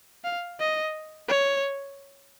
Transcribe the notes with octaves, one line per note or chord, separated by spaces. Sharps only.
F5
D#5
C#5